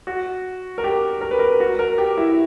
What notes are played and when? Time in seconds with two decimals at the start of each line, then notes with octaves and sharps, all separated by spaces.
0.07 F#4
0.78 A#4
0.84 G4
1.21 A#4
1.31 B4
1.39 A#4
1.60 F#4
1.79 A#4
1.98 G4
2.17 E4